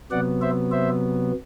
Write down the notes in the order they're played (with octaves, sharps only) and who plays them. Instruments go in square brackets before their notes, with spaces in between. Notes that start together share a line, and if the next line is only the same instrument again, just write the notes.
[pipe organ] C3 F#3 B3 D5 F#5
C5 E5
C5 E5